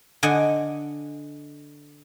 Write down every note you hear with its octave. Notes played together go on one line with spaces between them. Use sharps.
D3 D#5 F#5 G#5